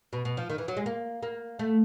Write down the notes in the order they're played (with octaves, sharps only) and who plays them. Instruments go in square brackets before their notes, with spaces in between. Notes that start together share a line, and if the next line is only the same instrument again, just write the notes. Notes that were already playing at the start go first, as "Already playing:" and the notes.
[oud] B2
B2
F3
D#3
E3
F#3
G#3
A#3
A#3
A3